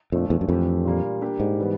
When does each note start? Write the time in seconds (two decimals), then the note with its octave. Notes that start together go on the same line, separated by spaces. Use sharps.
0.12 F2 A#2 F3 A3 D4
0.30 E2
0.41 F#2
0.49 F2 E3 A3 D4 G4
0.85 A#2 G3 A#3 D4
1.21 G3 A#3 D4 G4
1.40 G#2
1.59 E3 G3 B3